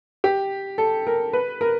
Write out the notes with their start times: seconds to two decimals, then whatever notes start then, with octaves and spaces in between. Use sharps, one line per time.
0.24 G4
0.78 A4
1.07 A#4
1.33 B4
1.61 A#4